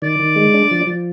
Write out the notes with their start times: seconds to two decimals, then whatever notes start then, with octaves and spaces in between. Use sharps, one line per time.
0.02 D#3 D5
0.20 D#3
0.36 G#3
0.54 D4
0.71 F3
0.87 F3